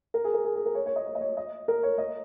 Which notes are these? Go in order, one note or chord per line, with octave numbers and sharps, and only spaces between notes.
A#4
G#4
A#4
G#4
G#4
A#4
C#5
C#5
D#5
C#5
D#5
C#5
D#5
A#4
C#5
D#5